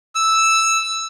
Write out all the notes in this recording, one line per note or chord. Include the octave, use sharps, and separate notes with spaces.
E6